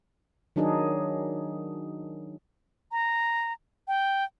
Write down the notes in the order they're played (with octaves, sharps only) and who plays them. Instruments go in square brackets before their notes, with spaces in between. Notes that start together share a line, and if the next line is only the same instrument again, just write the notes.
[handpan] D#3 F#3 D4 D#4 G#4
[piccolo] A#5
G5